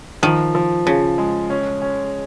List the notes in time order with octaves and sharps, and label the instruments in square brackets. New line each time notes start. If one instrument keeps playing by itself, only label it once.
[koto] D#3 [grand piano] F3
[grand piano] F3
[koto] C#3 [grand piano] F3
[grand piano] G#3
C#4
C#4